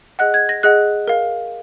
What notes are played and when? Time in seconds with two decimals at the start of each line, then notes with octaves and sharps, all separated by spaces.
0.19 G#4 D#5 F#5 F#6
0.34 G#6
0.49 A#6
0.63 G#4 D#5 F#5 F#6
1.08 A#4 F5